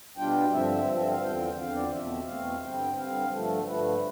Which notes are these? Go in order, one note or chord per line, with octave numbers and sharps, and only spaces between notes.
B2 G3 D4 F4 G5
G2 D3 F3 C4 E5
G2 D3 F3 C4
E5
F5
E2 D3 F3 C4 G5
E2 D3 F3 C4 F5
D5
E2 B2 A3 C4 E5
E2 B2 A3 C4 F5
G2 D3 G3 C4 G5
G2 D3 G3 C4 F5
G2 D3 F3 A3 A4
G2 D3 F3 A3 B4